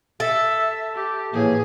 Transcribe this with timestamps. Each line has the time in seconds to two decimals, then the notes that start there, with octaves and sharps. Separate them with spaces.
0.20 A4 E5
0.95 G4
1.34 A2 E3 A#3 G#4